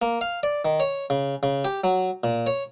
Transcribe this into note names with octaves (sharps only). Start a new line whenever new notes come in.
A#3
F5
D5
D#3
C#5
C#3
C#3
G4
F#3
A#2
C#5